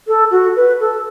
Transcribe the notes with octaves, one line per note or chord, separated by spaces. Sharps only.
A4
F#4
B4
A4